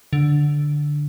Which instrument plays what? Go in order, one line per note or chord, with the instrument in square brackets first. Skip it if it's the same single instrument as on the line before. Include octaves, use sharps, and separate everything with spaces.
[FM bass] D3